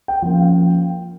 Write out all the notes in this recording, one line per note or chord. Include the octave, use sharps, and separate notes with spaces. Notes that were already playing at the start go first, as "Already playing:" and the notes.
G5
F3 A#3 C#4 G5
F5
G5